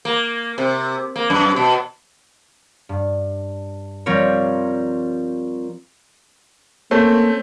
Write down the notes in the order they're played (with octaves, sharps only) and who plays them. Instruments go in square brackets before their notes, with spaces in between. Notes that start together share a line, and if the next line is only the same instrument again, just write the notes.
[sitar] A#3
C3
A#3
F#2
B2
[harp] G2
F3 G3 C4 A#4 C#5
[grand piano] A3 C4 C#4 [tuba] A#3